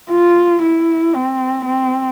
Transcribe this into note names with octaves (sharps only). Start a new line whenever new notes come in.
F4
E4
C4
C4